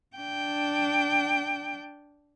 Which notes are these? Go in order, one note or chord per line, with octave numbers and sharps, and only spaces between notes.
D4 G5